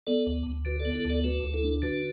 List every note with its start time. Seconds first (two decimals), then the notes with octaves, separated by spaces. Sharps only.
0.07 B3 A4 D5
0.26 D2
0.47 D2
0.65 D3 F#4 B4
0.80 A4 D5
0.85 B3
0.95 E4 A4
1.05 D2
1.10 A4 D5
1.24 A3 F#4 B4
1.43 D2
1.54 E4 A4
1.62 D4
1.82 D3 F#4 B4